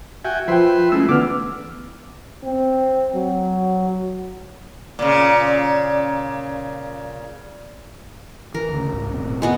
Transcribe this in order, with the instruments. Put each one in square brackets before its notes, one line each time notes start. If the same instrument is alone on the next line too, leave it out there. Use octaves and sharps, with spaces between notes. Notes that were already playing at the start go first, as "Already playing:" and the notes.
[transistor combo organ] F#4 G5 G#5 [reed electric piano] E5
[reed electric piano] F3 G5 [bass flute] F4 [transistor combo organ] B4 E5 C6
[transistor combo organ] G#3 A3 E4 [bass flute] C#4 [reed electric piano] E6
[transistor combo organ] D3 E3 A3 [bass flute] B3 [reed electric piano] D6 F6
[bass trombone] C4
F#3
[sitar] A#2 C#3
[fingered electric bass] E3 [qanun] A#4
[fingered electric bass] D2 C#3
C2 G#2
E1 A2 C4
[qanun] G#3 B3 F#4